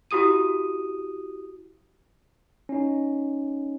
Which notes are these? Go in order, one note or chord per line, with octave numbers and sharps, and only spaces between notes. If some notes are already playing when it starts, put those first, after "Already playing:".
E4 F#4 G4 D#6 D#7
C#4 D#4